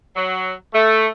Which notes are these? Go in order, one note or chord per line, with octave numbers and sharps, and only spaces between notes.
F#3
A3